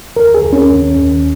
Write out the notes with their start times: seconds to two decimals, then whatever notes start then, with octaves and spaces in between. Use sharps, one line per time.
0.16 D#2 A#4
0.35 G#4
0.44 D#2
0.53 C#4
0.70 D#2
0.97 D#2